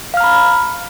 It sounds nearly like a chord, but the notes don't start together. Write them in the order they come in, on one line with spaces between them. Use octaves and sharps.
F5 F6 A#5 B5